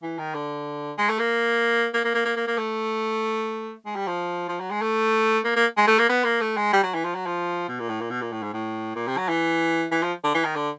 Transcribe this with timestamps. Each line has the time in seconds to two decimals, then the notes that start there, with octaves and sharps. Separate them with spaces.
0.02 E3
0.19 D#3
0.35 D3
0.98 G#3
1.09 A3
1.19 A#3
1.94 A#3
2.04 A#3
2.14 A#3
2.25 A#3
2.36 A#3
2.47 A#3
2.57 A3
3.86 G#3
3.96 G3
4.07 F3
4.49 F3
4.60 F#3
4.71 G#3
4.81 A3
5.44 A#3
5.56 A#3
5.77 G#3
5.87 A3
5.98 A#3
6.09 B3
6.24 A#3
6.41 A3
6.57 G#3
6.73 G3
6.83 F#3
6.94 E3
7.04 F3
7.15 F#3
7.26 F3
7.68 B2
7.79 A#2
7.89 A2
8.00 A#2
8.10 B2
8.21 A#2
8.32 A2
8.43 G#2
8.53 A2
8.95 A#2
9.07 C3
9.17 F#3
9.28 E3
9.91 E3
10.03 F3
10.24 D3
10.34 E3
10.44 D#3
10.56 D3